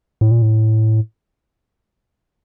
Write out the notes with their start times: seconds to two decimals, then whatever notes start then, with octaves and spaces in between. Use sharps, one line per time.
0.21 A2
0.31 A#2
0.42 A2